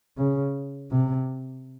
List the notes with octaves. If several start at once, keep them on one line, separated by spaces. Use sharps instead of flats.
C#3
C3